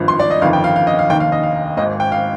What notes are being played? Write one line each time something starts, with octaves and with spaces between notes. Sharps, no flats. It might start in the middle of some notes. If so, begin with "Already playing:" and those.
Already playing: G#1 G2 F3
C6
D5
D#5
G1 F2 D#3 F5
G5
F5
F5
D#5
F5
F1 D#2 D#3 G5
F5
D#5
F5
G#1 G#2 D#3 D#5
G5
F5